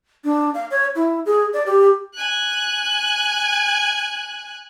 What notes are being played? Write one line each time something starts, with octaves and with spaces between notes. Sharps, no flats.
D4
F5
C#5
E4
G#4
D5
G4
G#5 F#6